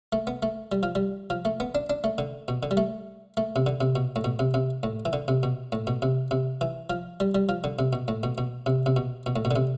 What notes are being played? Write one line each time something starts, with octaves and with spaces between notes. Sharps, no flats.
A3
B3
A3
G3
F3
G3
F3
A3
B3
D4
D4
A3
D3
B2
D3
G3
A3
A3
C3
D3
C3
B2
A2
B2
C3
C3
A2
E3
D3
C3
B2
A2
B2
C3
C3
E3
F3
G3
G3
F3
D3
C3
B2
A2
B2
B2
C3
C3
B2
B2
A2
B2
D3
C3